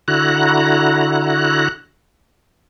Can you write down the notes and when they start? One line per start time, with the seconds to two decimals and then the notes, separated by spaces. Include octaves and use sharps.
0.08 D3 E4 F#4 A#5 F#6